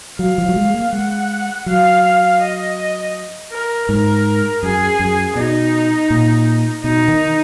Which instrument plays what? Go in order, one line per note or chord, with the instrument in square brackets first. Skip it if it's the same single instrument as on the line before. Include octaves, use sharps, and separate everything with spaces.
[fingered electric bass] F#3 [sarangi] F5
[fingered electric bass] F3
F#3
G#3
A#3
[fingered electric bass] G#3 [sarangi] F#5
[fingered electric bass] F#3 [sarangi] F5
[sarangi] D#5
A#4
[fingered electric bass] G#2 [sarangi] A#4
[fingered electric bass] F#2 [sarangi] G#4
[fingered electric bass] F#2
[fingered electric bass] B2 [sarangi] D#4
[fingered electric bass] A#2
[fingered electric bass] B2 [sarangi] D#4
[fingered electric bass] D#3